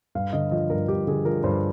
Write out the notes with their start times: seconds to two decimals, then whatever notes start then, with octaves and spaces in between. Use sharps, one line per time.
0.15 G2 F5
0.33 D3 D#5
0.51 F3 D#5
0.70 G2 A#4
0.88 G2 G4
1.07 D3 G#4
1.25 F3 A#4
1.44 G2 C5